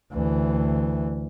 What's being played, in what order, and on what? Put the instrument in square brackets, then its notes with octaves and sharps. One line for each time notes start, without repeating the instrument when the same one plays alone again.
[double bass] D2 E3